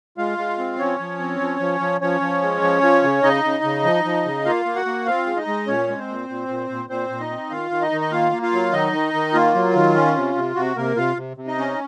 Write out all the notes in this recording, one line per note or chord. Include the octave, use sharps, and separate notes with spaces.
G#3 F4 F5
G#3
C4
F3 C#4 C#5
F3
C4
F3
F3
F3
F3 C#4 C#5
F3
G#3
F3
F3
C#3
C#3 D#4 D#5
C#3
C#3
F3
F3
C#3
A#3 F4 F5
A#3
F#4 F#5
A#3
C4 F4 F5
G#3
D#4 D#5
G#3
A#2 C#4 C#5
G#3
C4 C5
A#2
A#2
A#2
A#2
A#2 C4 C5
A#2
D#4 D#5
C4
D#3 F4 F5
D#3
D#4 D#5
D#3
D#5
A#3 F4 F5
A#3
F4 F5
F#3
D#3 D#4 D#5
D#3
D#3
A#3 F4
F#3
D#3
C#4
C3
C3
C3 F#4
C3 A#3 A#4
C3 F4 F5
C3
C3
D#4 D#5
C#4